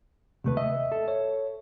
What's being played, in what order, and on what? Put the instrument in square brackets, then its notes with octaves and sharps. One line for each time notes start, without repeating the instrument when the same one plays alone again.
[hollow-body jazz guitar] D#2 A3 B4 [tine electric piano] C3
[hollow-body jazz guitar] D#5 [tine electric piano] E5
[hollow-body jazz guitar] A4
[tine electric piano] C#5